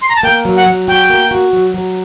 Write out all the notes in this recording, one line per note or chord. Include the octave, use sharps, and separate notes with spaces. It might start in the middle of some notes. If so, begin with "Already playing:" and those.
C6
A#5
A5
A#3 G5
F#3
F#5
F#3
F#4 G5
A#3
F#4
F#3
F#3